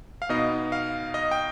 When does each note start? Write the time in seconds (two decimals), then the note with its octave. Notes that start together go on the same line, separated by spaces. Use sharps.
0.22 F5
0.29 B2 B3 D#4 D#5
0.72 F5
1.14 D#5
1.31 G5